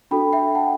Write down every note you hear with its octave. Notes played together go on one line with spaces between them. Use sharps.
D4 F#4 A4 G5 B5
E5 G5
F#5 A5